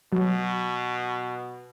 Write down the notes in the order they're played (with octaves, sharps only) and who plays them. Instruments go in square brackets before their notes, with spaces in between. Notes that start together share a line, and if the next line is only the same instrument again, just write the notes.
[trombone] B2 [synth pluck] F#3